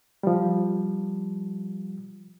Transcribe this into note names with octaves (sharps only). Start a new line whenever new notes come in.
F3 G3